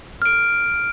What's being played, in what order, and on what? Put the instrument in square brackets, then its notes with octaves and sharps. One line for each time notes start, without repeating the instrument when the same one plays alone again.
[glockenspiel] F6 D7